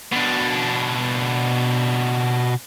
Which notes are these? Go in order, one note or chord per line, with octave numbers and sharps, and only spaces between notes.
B2 D4